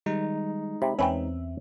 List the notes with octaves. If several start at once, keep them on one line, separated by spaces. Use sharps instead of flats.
D#3 G3 G#3 D#4
C3 B5
E2 C4 C#4 B4 E5 G5